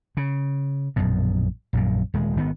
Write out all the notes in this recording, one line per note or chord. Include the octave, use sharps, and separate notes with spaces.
C#3
A#1 F#2 B2
A#1 F#2 A#2
D#1 G#3
G#1 D#3 B3